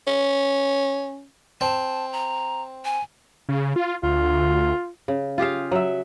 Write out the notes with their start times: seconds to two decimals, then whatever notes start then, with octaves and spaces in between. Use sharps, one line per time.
0.07 C#4
1.61 C4 A5
2.13 A#5
2.85 G#5
3.49 C#3
3.76 F4
4.03 D2 F4
5.08 C#3
5.38 F4 G4 G#4 F5
5.72 F#3 E5